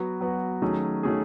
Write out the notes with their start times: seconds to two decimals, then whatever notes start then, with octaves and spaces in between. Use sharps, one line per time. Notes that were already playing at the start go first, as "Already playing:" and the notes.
Already playing: F#3 B3 F#4
0.20 F#3 B3 F#4
0.62 D#3 F#3 A3 C#4 G#4
1.03 D#3 F#3 A3 C#4 G#4